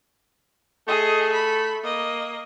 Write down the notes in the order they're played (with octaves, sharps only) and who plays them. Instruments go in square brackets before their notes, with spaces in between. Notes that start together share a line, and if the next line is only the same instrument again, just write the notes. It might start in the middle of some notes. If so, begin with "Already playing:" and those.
[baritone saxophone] A3 [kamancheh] G#4 D#5
[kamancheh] B5
A#3 D#5